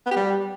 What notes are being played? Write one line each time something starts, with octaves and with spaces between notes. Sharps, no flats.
B3
G4
G3